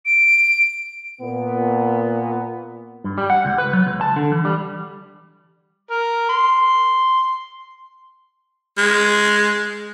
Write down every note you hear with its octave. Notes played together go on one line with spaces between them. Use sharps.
D7
A#2 B3
G2
G3
F#5
C#2
B4
F#3
C#2
A5
D3
E3
G3
A#4
C6
G#3